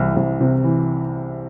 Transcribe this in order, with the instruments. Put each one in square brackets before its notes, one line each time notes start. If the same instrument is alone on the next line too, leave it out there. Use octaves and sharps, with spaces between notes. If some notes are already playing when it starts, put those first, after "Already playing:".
Already playing: [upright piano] C2 C3 E3
C2
C3
E3